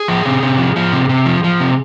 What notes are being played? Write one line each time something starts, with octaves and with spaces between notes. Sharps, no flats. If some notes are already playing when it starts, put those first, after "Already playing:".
Already playing: G#4
F3
C3
C3
F3
F3
C3
C3
F3
F3
C3